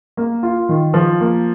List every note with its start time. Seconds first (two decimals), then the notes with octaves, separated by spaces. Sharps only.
0.17 A#3
0.43 F4
0.69 D#3
0.94 F3
1.21 A#3